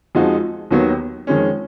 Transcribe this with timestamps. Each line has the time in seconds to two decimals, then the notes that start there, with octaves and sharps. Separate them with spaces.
0.15 F2 F3 G#3 D#4 F#4
0.71 D#2 D#3 F#3 B3
1.27 F2 D#3 G#3 C#4